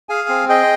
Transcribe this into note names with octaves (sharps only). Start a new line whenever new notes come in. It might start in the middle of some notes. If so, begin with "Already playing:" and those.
G#4 F5 G#5
C4
G#4 D#5 G5